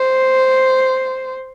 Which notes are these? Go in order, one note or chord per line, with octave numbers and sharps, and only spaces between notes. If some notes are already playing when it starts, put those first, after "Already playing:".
Already playing: C5